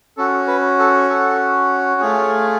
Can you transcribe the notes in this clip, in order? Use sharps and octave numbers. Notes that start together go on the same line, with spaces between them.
C#4 F#4 A4
B4
A4
A4
A3 F4 G#4 C#5